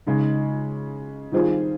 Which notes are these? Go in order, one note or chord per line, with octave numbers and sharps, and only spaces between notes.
C#3 G#3 D#4
D#3 G3 C4 F4 G#4